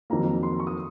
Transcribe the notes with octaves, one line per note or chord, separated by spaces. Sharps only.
F2 D#3 F#3 A#3 A#5
C6
C#6
D#6